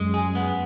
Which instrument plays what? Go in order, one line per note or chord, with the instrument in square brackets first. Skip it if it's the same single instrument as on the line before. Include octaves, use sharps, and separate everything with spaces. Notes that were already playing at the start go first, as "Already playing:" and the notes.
Already playing: [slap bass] F#2 [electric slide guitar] G#3
[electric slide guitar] G#4
B3